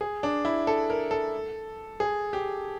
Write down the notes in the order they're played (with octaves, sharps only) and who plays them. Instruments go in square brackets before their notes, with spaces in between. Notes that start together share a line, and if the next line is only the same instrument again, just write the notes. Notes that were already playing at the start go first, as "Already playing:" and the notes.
[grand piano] G#4
D4
E4
A4
A#4
A4
G#4
G4